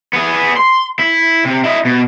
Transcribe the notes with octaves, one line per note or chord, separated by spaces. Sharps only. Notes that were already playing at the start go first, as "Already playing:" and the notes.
B3 G#4
C6
E4
C3
E4 D#5
B2